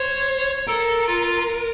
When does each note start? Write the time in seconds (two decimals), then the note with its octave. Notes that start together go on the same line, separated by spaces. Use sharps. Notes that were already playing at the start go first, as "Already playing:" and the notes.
Already playing: C5 C#5
0.67 A4 A#4
1.07 F4